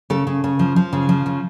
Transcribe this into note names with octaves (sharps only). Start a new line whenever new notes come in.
C#3 A4
C#3
C#3
F3
F3
C#3
F3
C#3